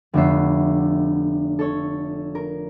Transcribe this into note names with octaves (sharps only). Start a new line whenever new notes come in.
F1 D3 B3 C#5 E5 C7
A4 C#5
A#4